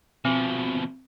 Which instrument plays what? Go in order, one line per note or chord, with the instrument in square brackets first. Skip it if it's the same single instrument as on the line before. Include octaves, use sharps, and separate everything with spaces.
[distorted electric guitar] B2 F3 [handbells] C4 G#5